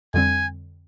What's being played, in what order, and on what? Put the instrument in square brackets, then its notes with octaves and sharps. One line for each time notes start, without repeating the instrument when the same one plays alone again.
[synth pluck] F2 D3 G3 C4 [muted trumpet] G#5